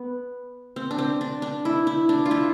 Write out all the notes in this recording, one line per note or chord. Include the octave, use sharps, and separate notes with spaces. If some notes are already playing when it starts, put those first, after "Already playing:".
Already playing: B3
C4
D4
C4
D4
D4
E4
E4
D4
F4
E4